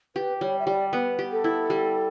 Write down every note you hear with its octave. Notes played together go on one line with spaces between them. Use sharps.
G4 B4
G3 C#5
E5
G3 D5
B3 B4
G4
A4
E4
G3